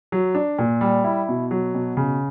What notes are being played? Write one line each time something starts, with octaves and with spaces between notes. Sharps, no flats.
F#3
D4
A#2
G3
E4
B2
F#3
B2
C#3